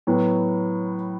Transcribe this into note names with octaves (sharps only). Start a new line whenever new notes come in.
A2 F#3 B3